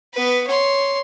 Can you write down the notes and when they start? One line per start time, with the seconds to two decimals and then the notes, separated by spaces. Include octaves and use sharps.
0.14 B3 B4
0.47 C#5 C6